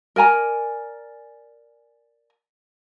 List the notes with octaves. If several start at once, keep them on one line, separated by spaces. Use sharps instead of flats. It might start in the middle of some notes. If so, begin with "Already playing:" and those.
A#4 D5 G#5 A#5